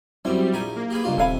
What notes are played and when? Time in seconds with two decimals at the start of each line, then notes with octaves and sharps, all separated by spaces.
0.25 F#2 G3 C4 E4
0.53 A#1 A#4 G#5
0.76 A#3
0.90 G4 G#4 B4
1.04 C#2 G2 F4
1.18 D#1 C3 A4 F5 G#5 B5